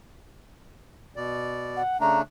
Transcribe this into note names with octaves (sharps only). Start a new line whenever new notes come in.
B2 D5
F#5
C#3 A3 D4 A#5